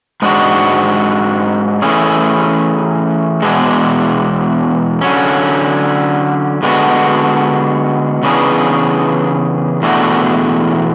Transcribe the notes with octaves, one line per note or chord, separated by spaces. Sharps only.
G#2 G#3 D4 F#4
E3 A3 C#4 G#4
E2 B2 G#3 D4 G#4
D3 F#3 C#4
D3 G#3 B3 D4 F#4
C#3 E3 B3 D4 G#4
E2 B2 A3 D4 F#4